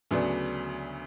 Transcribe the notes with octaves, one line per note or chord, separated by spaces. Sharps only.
D2 C#3 F#3 B3 D4